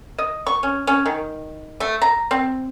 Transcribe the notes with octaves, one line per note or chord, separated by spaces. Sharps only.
D#5
C#6
C#4
C#4
D#3
A3
A#5
C4